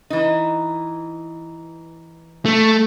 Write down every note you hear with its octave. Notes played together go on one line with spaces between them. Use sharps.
E3 D#4
A3